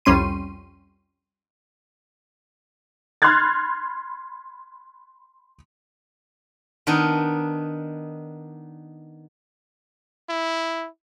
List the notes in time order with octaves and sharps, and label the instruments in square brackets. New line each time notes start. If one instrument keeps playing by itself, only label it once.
[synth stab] C2 F2 G3 C#4 C6 D#7
[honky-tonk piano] B5 C6 F6 F#6 G#6 A6
[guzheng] D#3 B3 D4 D#4
[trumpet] E4